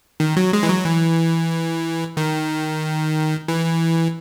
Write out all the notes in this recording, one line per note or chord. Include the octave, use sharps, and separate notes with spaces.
D#3
F#3
G#3
E3
F#3
E3
D#3
E3